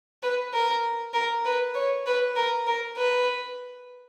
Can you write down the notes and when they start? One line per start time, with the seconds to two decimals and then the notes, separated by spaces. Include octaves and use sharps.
0.23 B4
0.54 A#4
1.14 A#4
1.45 B4
1.75 C#5
2.06 B4
2.36 A#4
2.67 A#4
2.97 B4